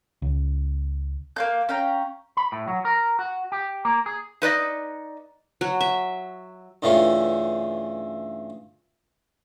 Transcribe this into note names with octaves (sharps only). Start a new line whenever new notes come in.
C#2
A#3 F5 G6
C#4 F5 G5 A#5
B5
A2
F#3
A#4
F#4
G4
A#3
G#4
D#4 B4 D5 D#5
F#3
E5
G2 C#3 E3 A3 F4